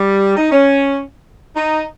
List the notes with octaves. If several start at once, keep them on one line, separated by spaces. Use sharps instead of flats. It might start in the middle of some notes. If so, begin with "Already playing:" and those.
Already playing: G3
D#4
C#4
D#4